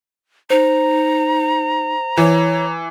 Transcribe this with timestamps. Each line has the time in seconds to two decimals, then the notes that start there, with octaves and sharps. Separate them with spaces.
0.50 D#4 C5 A#5
2.18 E3 C#5